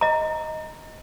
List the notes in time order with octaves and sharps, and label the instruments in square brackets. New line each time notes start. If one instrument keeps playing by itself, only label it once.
[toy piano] D#5 A#5